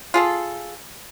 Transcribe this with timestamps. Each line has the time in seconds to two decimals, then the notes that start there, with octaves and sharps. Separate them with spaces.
0.14 F4 G#4 A4